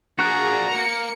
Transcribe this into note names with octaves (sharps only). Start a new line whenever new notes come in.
A#3 D4 F#4 G#4 A#5 F#6
A#3 A#4 C#7